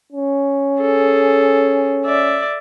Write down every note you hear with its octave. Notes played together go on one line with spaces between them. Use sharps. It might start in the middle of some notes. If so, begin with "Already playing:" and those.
C#4
G#4 A4
D5 E5